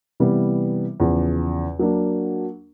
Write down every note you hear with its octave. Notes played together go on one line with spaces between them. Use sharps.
C3 E3 G3 B3
E2 C#3 F3
F#3 A#3 D4